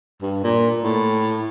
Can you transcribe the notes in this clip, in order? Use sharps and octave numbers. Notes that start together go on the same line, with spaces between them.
G2
A#2
A2